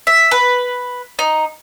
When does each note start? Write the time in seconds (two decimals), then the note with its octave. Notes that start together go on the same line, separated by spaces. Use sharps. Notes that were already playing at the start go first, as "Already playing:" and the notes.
0.07 E5
0.31 B4
1.19 D#4